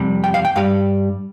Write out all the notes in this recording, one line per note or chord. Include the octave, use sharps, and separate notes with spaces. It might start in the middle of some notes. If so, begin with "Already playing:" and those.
Already playing: F2 C3 G3
G5
F5
G5
G2 G3 F5